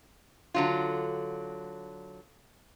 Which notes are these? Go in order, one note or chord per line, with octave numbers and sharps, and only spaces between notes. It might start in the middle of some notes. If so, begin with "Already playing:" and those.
D3 F#3 F4